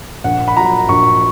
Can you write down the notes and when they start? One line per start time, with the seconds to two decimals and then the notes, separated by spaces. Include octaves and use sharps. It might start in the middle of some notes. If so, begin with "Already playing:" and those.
0.24 A#1 F#5
0.48 B5
0.56 A#2 F#3 A#5
0.89 A#1 C#6